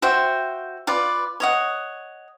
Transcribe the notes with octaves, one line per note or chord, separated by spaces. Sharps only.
F#4 C5 E5 G5
F4 B4 D5
C#5 D#5 F#5